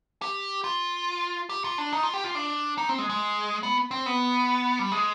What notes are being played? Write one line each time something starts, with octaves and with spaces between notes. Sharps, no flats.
G4
F4
G4
F4
D4
D#4
F4
G4
F4
D4
D#4
C4
G#3
G#3
B3
C4
B3
G3
G#3